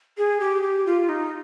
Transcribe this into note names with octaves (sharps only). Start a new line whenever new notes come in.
G#4
G4
G4
F4
D#4